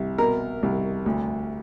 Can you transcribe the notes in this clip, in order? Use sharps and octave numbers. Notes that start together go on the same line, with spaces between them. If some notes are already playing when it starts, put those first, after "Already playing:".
Already playing: C2
B2 A#4
C2
D2